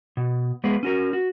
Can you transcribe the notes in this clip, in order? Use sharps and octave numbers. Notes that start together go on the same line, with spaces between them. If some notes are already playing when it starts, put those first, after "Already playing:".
B2
G#3 B3 G#4 B4
C#4 F#4 A#4
F#4